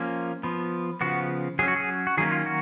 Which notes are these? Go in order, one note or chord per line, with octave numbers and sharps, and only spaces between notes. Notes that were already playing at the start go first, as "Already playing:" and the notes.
Already playing: F3 A#3 C#4
F3 B3
C#3 F3 B3 F#4
F#3 C#4 G#4
F#4
G#4
F#4
D#3 F#3 A#3 C#4 G#4
F4
F#4